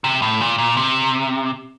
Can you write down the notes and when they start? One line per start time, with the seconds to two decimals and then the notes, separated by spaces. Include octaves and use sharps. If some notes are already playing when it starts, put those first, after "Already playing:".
0.04 C3
0.22 A2
0.41 A#2
0.58 A#2
0.77 C3